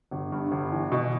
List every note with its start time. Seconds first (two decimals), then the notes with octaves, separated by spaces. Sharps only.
0.11 G1
0.32 G2
0.51 G1
0.72 E3
0.92 B2